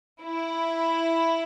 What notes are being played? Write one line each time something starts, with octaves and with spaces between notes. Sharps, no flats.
E4